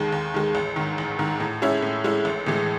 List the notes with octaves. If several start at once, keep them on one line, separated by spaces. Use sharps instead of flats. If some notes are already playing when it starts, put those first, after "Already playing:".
Already playing: D#2 D#3 G#3
D#2
D#3 G#3
A1
G#2 D#3
A1
G#2 D#3
A2
G#3 C#4 E4
A2
G#3 C#4 E4
A1
A2 E3 G#3